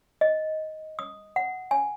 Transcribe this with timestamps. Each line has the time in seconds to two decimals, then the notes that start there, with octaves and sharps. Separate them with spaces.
0.21 D#5
0.99 D#6
1.36 F#5
1.71 G#5